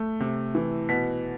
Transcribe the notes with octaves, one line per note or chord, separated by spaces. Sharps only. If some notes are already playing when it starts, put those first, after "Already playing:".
Already playing: A3
C3
E3
B2 B6